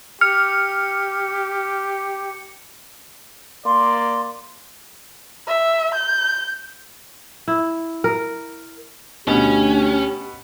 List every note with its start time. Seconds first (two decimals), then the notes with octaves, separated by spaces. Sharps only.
0.21 G4 F6 C#7
3.66 A#3 D5 C6
5.48 E5
5.95 G6
7.48 E4
8.04 A#4
9.27 D2 B2 C#4 G4